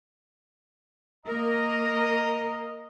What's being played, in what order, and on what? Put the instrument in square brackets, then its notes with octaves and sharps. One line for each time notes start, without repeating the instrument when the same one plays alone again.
[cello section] A#3 A#4 [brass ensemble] D#5 A#5